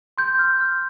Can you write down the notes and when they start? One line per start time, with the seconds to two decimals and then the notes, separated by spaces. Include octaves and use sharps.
0.18 C6 G6
0.39 F6
0.61 F6